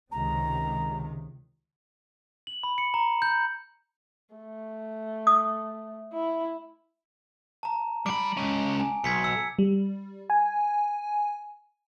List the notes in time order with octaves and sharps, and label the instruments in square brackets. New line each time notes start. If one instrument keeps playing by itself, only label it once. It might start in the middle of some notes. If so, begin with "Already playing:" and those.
[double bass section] C#2 C3 D#3 [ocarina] A#5
[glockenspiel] F#7
B5
C#7
A#5
G6
[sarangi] A3
[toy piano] D#6
[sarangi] E4
[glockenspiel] A5 A#5
[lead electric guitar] G3 B5 [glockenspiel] D6 D7
[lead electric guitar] G#3 C#4
[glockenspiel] G#5
[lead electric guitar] B1 [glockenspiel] G#6 B6 C#7
[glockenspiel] E6 C#7
[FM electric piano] G3
G#5